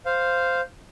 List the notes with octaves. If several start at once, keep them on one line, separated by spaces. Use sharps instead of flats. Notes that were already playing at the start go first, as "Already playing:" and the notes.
C5 F5